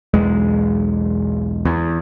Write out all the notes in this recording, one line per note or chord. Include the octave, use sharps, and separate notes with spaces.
B1 E2 G#3
E2